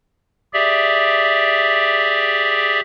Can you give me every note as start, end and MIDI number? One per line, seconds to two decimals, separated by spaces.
0.53 2.80 67
0.53 2.80 68
0.53 2.80 74
0.53 2.80 76